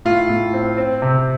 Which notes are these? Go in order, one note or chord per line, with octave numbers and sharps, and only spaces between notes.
A2 F4
A2
C4
C4
C3